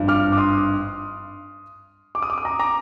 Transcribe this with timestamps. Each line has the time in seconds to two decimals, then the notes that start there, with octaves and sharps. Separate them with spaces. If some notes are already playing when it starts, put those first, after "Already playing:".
Already playing: G#1 G2 F3
0.08 D6 F6
0.32 D6
0.37 C6 D#6
2.15 D6
2.22 D#6
2.30 D6
2.38 D#6
2.45 A#5 D6
2.59 A#5 D6